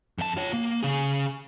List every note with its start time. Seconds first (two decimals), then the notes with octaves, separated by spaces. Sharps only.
0.18 F2 A5
0.37 F4 C#5
0.53 A#3
0.83 C#3 G#4